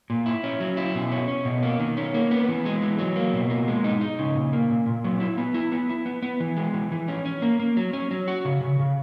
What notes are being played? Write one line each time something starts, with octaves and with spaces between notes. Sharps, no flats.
A#2
E4
C#4
F#3
E4
B2
C#4
C#4
B2
A#3
D#3
C#4
A#3
B3
E3
G#3
E3
F#3
A#3
B2
A#3
G#3
D#4
D#4
C#3
A#2
A#3
A#2
A#2
F#3
E4
B3
E4
B3
E4
B3
B3
E3
G#3
E3
E3
C#4
C#4
A#3
A#3
F#3
C#4
F#3
F#4
C#3
C#3
C#3